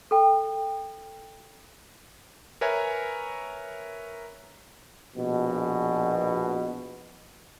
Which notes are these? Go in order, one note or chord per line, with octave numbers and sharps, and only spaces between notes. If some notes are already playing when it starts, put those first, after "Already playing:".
A4 G5
A#4 B4 C#5 E5 G#5 A#5
A#1 B2